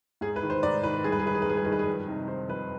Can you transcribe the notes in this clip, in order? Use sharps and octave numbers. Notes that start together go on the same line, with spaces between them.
G#2 G#4
B4
D#3
C5
G#2 D5
D#3 B4
G2 G#4
B4
G#4
D#3 B4
G#4
B4
G2 G#4
B4
D#3 G#4
B4
G#4
F2
C3 D#4
D#3 C5
F2 B4